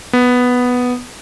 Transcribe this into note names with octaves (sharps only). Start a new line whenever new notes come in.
B3